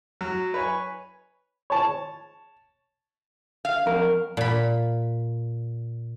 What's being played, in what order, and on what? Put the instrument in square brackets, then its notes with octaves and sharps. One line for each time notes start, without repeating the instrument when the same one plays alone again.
[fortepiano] F#3
B4 C#5 G#5
C#5 A5
[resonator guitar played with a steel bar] F5
[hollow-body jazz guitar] F2 A#4
[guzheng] A#2 B5